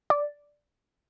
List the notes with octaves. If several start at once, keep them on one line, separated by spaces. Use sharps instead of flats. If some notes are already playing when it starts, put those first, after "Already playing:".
D5